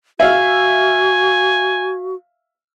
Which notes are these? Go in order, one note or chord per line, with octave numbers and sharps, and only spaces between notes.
F#4 E5 F5 G#5